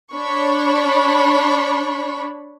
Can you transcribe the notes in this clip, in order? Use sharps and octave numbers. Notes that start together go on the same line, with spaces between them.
D4 C#5 B5 C#6